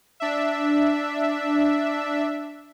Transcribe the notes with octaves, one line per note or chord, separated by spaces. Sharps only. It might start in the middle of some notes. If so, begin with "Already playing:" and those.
D4 E5